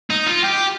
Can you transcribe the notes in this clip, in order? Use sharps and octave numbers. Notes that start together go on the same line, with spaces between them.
D#4
F4
G4